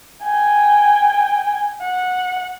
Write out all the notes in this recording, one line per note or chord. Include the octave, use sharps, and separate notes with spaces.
G5 G#5
F#5